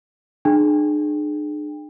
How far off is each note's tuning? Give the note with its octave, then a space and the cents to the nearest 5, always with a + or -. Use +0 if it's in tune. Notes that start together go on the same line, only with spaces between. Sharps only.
D4 +45 G#4 +25 G5 +30